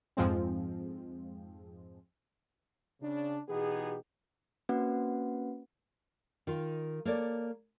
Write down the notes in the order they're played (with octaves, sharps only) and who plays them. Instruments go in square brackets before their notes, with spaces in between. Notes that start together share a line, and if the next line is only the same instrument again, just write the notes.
[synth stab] F2 G#2 F3 G#3 C4
[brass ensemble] C#3 D4
B2 E3 B3 D#4 G4 G#4
[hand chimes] A#3 C4 C#4 F#4 B4 F#5
[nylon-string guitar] D#3 F4
A#3 A4 C#5 D5